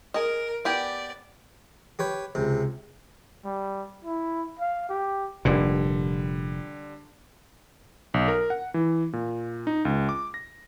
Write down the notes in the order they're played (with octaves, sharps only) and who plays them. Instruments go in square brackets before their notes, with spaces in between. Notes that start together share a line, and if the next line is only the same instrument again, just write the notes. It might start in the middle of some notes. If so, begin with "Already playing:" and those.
[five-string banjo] G#4 D#5 [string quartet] A#4
[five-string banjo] B3 G4 G#5 [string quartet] D5
[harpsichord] G4 B4 C#5
C#2 C3
[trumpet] G3
E4
F5
G4
[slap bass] F1 A#2 [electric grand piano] D3 G3
[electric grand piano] B1
A#4
F#5
E3
A#2
D#4
C#2
D6
A#6